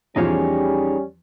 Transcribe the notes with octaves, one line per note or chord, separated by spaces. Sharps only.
E2 F3 G3 C#4 D#4 G#4 C5 C#5